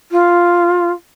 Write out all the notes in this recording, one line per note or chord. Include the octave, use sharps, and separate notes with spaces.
F4